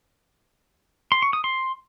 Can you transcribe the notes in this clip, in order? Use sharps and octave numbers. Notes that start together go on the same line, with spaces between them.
C6
C#6
D#6
C6